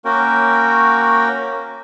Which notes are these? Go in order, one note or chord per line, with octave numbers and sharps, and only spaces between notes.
A#3 C#4 F#4 A#4 G5